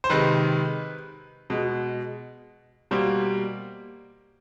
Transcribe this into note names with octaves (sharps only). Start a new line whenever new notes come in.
C5
C3 D#3 G#3 B4
B2 G#3
B2 G3 A#3 C5